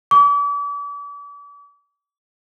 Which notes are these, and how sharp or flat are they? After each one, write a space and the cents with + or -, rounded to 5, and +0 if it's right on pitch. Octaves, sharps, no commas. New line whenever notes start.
D6 -40